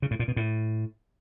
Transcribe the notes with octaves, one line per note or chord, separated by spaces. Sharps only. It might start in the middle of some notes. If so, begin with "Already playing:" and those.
C#3
A2
A#2
B2
A2